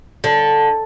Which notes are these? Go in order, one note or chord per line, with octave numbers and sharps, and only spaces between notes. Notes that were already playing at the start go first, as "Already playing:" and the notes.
D3